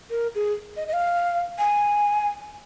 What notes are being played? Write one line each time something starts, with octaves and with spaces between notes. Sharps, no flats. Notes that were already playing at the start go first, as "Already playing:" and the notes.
A#4
G#4
D#5
D#5
F5
G#5